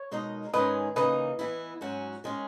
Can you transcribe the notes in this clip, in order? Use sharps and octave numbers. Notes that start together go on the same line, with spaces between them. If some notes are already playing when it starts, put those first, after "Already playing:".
Already playing: C#5
B2 G#3 D#4 A#4 D#5
G#2 D#3 G#3 C#4 G#4 B4 D#5
C#3 E3 A#3 D#4 B4 D#5
E3 B3 E4
G#2 F#3 C#4 F#4
D#3 G#3 C#4